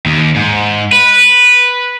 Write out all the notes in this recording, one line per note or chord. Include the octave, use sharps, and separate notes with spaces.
D#2
G#2
B4